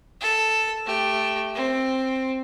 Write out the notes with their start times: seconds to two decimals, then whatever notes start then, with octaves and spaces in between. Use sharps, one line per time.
0.21 A4
0.86 A3 G4
1.55 C4